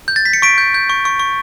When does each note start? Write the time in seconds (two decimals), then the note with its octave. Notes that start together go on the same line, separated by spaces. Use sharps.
0.08 G6
0.16 A6
0.25 B6
0.33 C#7
0.42 C#6 B6 D7
0.58 G6
0.74 G6
0.90 C#6
1.05 C#6
1.20 C#6